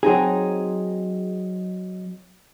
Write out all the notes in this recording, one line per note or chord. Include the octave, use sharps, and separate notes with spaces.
F#3 C4 D#4 G#4